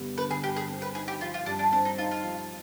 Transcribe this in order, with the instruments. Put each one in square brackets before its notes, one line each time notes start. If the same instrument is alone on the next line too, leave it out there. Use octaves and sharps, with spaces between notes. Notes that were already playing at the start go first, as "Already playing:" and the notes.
Already playing: [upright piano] G2 D3 G3 B3
[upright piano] D3 [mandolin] B4
[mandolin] G#4
[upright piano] G2 [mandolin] G4
[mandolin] G#4
[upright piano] C4
[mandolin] B4
[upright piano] D#4 [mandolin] G#4
[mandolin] G4
[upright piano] F3 [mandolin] F4
[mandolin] F4
[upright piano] G2 [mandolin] D4
[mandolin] D4
[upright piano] C4 [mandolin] D4
[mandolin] D#4
[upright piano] D#4 [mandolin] F4
[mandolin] F4
[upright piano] F3